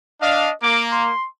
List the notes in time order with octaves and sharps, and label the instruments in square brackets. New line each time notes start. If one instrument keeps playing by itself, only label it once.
[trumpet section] D4 F5 [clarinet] D#5
[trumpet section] A#3 [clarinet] D6
[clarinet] C6